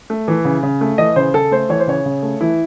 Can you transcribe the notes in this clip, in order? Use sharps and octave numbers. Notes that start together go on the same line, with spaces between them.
A3
E3
C#3
C#3
A3
E3 D#5
C#3 C5
C#3 A4
A3 C5
E3 C#5
C5
C#3 C#5
C#3
A3
E3 E4